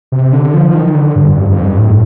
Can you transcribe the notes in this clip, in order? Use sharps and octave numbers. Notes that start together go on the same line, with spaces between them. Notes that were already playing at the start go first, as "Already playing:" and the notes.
C3
D3
F3
F3
D#3
D3
G2
F2
F2
G2
A2